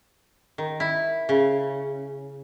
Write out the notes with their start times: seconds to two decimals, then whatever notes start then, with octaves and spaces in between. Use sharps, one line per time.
0.58 D#3
0.80 E4
1.29 C#3